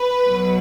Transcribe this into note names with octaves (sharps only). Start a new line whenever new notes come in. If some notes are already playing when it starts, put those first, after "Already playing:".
Already playing: B4
B1 B2 F#3